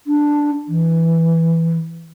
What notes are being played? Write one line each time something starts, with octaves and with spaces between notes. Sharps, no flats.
D4
E3